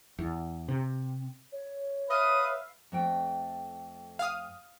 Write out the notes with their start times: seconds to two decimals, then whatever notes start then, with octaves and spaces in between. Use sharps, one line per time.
0.19 E2
0.68 C3
1.52 C#5
2.10 B4 E5 F5 D#6
2.92 F2 A3 G5
4.19 F5 D#6